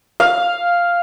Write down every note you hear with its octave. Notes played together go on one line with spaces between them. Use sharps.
F5